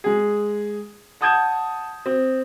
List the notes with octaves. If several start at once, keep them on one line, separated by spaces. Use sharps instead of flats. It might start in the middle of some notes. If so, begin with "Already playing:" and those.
G#3 G#4
F#5 A5 D#6 G6 G#6 E7
C4